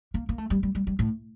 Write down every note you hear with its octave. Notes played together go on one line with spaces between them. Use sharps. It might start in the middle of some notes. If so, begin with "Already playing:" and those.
A#3
A#3
A3
G3
G3
G3
G3
A2